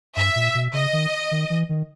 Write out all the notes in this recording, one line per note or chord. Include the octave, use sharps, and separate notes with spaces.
G2 E5
A#2
B2
C#3 D#5
D#3
D#3
E3
D#3